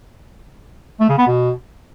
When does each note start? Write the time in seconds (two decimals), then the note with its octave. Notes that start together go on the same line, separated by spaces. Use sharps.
1.00 A3
1.09 C#3
1.18 B3
1.27 B2